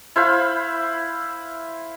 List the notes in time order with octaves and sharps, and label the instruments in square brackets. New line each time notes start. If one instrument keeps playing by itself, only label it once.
[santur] E4 C5 F5 B5